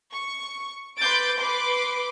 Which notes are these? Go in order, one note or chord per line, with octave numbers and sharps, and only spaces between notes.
C#6
B4 C6 D6 G6 A6 D7
B4 C6 D6